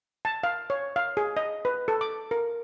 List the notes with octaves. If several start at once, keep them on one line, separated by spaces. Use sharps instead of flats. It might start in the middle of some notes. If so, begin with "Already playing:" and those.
A5
F5
C#5
F5
G#4
D#5
B4
A4
D6
A#4